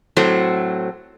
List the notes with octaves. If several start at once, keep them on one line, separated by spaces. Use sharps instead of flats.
A2 F#3 A3 C4 C5